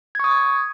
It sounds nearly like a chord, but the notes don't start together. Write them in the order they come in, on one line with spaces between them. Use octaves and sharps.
G#6 C#6 D#6